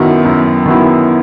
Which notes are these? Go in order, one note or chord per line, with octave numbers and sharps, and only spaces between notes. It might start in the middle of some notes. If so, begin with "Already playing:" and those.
Already playing: F#2 D#3 F#3 B3 E4
F#2
D#3 F#3 B3 E4